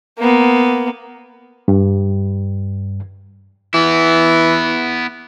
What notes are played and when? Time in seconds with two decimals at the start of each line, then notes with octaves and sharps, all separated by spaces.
0.18 A#3 B3
1.68 G2
3.74 E3 B3 E4